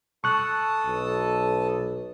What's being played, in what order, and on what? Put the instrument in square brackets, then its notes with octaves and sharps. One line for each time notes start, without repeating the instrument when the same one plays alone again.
[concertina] A4 A5 D#6 [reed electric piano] C#6 F#6
[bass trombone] B1